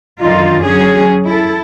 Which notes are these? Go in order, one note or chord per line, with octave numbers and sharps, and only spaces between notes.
F#2 D3 D#3 D#4 F4
F#3 C#4 G#4
E4 A4